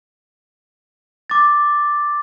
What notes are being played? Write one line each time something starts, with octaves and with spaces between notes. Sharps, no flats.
D6 A6